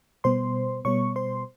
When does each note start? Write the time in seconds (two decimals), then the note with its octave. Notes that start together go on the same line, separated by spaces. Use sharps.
0.24 B2 G3 B3 C5 C6
0.85 B2 G3 B3 C#5 C#6
1.16 C5 C6